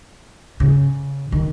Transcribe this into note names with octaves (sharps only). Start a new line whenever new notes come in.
C#3
D#3